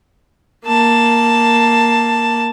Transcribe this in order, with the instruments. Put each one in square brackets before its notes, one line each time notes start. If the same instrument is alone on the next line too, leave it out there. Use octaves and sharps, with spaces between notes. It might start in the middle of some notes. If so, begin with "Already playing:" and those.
[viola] A#3 A5